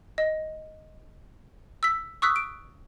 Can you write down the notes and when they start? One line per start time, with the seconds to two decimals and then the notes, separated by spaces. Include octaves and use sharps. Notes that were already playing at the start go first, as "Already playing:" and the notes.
0.18 D#5
1.83 E6 B6
2.22 C#6 D#6 E6 F#6 B6
2.36 D7